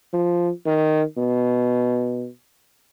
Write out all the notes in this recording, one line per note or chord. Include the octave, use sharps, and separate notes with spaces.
F3
D#3
B2